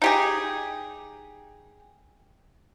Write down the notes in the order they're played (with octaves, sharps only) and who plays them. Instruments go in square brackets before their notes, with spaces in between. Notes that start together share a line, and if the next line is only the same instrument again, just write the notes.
[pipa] D#4 G4 G#4